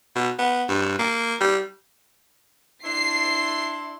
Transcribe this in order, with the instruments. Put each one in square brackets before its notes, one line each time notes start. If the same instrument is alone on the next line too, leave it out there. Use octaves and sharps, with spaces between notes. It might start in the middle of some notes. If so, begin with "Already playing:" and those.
[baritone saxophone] B2
B3
G2
A#3
G3
[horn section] D4 E4 C6 [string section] C7